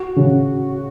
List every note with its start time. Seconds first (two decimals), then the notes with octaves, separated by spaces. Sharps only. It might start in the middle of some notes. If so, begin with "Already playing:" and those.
Already playing: F#4
0.16 C#3